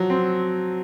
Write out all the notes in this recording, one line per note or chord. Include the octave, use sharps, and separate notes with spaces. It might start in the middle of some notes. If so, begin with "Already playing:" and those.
Already playing: F3 F#3
C4